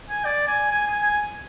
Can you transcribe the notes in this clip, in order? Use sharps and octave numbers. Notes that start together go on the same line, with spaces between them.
G#5
D5
G#5
G#5
G#5
G#5